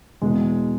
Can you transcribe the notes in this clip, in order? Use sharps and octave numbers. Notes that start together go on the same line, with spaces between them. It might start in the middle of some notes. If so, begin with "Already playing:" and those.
E2 B2 G#3